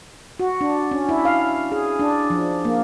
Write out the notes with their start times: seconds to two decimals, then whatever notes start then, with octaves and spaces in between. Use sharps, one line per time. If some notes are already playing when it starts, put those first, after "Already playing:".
0.40 F#4
0.61 D4
0.91 C#4
1.09 E4
1.25 F5
1.72 G#4
1.99 D4
2.30 F3
2.65 A#3